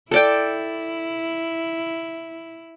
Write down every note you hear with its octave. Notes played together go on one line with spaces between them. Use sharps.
E4 A4 D5 G5